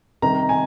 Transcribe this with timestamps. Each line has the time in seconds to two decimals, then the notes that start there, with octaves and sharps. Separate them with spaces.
0.22 C3 D#3 G3 A#5
0.49 G#5